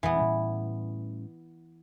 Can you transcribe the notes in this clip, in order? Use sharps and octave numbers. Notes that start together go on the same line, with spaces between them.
D#1 E2 E3 B3
A2 G3 C#4